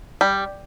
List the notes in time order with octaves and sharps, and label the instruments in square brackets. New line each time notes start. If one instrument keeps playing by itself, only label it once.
[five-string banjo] G3